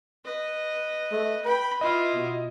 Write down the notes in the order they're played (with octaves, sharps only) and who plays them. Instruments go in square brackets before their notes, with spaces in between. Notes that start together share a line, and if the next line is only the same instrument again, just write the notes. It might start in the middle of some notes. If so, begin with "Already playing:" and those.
[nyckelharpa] B4 D#5
[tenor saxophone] A3
[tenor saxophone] B4 [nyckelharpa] G5 B5
[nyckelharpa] E4 F4 [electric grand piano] D#5
[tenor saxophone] B2